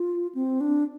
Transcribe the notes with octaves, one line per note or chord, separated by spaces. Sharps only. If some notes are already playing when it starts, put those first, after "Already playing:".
Already playing: F4
C4
D4